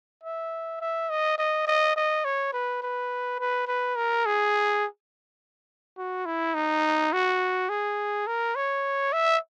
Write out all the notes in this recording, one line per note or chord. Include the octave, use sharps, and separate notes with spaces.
E5
E5
D#5
D#5
D#5
D#5
C#5
B4
B4
B4
B4
A#4
G#4
F#4
E4
D#4
F#4
G#4
A#4
C#5
E5